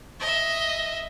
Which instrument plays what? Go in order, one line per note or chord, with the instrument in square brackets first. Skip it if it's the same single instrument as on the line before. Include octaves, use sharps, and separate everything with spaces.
[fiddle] D#5 E5